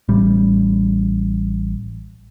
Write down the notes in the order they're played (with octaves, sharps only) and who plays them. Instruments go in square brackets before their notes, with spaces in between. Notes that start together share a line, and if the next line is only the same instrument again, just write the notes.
[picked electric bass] A1 G3